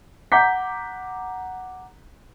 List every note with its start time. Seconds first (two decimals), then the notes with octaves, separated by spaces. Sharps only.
0.32 F#5 A#5 D6 G6 B6